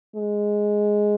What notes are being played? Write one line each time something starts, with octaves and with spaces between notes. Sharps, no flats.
G#3